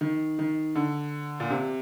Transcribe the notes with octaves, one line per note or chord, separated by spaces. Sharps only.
D#3
D#3
D3
A#2
C3